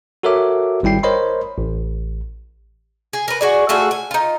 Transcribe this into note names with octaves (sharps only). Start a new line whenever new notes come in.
F#4 A4 A#4 C#5 E5 D6
G#1 G3 E4 G5 C7
A#4 C5 C#5 D#5 B5 C6
A1
G#4
A#4 B4
F#4 G#4 D5
A3 F4 F#4 G#4
G#5
D#4 F4